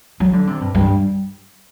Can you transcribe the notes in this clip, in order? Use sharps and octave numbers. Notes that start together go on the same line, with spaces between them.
F#3
D3
C3
G2
G2